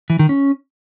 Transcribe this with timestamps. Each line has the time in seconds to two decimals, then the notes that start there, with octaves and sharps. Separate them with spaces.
0.10 E3
0.19 D#3
0.29 C#4